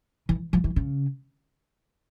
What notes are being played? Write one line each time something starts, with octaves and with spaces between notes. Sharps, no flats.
E3
F3
E3
C#3